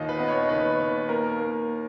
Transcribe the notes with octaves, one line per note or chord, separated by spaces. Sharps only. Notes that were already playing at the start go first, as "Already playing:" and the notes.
Already playing: D#2 A#2 D#5
B4
B3 D#5
C#5
D#2 B4
D#2
A#3 A#4
A#3